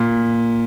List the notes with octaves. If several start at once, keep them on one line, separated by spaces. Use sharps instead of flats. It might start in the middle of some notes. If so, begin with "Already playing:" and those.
Already playing: A#2